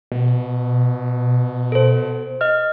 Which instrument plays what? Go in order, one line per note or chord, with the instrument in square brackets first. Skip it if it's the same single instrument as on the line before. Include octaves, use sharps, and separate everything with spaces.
[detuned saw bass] B2
[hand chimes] A4 C5
D#5 F6